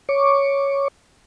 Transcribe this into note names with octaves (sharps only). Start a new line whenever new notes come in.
C#5 C#6 D6